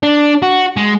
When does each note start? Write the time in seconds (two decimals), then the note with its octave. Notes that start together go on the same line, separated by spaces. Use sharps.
0.03 D4
0.42 F#4
0.77 G#3